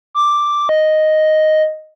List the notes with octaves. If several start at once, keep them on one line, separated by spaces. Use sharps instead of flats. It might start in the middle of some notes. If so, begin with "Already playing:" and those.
D6
D#5